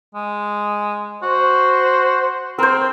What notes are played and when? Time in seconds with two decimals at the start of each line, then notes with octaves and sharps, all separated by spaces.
0.15 G#3
1.23 F#4 C5
2.58 C4 A#4 C5